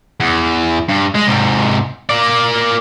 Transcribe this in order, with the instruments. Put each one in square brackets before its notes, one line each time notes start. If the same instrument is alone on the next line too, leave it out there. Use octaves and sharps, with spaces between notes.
[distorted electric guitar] E2
G2
G#3
G#2 C3
A#3 D5